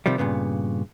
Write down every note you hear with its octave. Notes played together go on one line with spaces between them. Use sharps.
C3 D#3 F3 G3
G2 A#2 C#3 B3